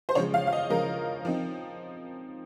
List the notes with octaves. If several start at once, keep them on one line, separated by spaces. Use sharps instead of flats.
C5
C#3 F3 G#3 C#5
F5
F5
D#5
C#3 F3 G#3 A#4
F3 C4 D#4